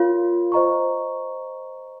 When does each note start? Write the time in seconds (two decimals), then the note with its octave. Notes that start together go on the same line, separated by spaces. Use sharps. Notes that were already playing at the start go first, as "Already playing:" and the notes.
Already playing: F4 A#4 C#5 F5 C6
0.52 C5 D#5 A#5 C#6